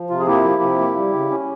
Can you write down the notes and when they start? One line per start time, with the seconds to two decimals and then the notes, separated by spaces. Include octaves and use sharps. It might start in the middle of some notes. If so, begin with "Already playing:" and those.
Already playing: F3
0.10 C3 F4
0.20 G#4
0.27 A#3 E4 G4
0.44 F3
0.62 C3
0.79 A#3
0.96 G3
1.13 C#3
1.31 C#4